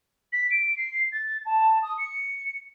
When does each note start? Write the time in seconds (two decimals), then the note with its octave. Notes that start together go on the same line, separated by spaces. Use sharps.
0.32 B6
0.50 D7
0.77 C7
1.12 A6
1.45 A5
1.82 D#6
1.98 C#7